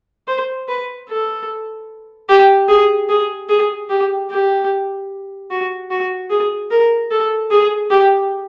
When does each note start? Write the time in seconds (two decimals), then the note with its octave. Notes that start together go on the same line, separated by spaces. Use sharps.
0.27 C5
0.69 B4
1.09 A4
2.29 G4
2.68 G#4
3.09 G#4
3.49 G#4
3.90 G4
4.30 G4
5.50 F#4
5.90 F#4
6.30 G#4
6.71 A#4
7.11 A4
7.51 G#4
7.90 G4